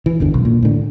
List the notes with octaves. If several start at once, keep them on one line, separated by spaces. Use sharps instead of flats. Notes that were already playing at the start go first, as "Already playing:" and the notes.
E3
G1 E2 D3
B1
A#2
A2 D3